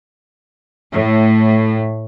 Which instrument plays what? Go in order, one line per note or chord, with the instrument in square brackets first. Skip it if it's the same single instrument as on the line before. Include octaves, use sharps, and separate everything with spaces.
[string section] A2